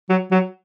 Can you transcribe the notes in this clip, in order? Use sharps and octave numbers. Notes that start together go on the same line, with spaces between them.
F#3
F#3